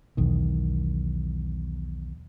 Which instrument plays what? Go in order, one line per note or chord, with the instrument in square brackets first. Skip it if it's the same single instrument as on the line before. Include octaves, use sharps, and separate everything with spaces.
[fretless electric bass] B1 E2 D#3